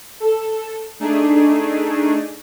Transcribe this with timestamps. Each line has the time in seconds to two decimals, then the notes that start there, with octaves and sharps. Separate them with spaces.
0.20 A4
1.00 A3 D4 D#4 G#4